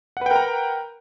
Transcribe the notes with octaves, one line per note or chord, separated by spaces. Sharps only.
A#4 B4 F#5 G5 A#5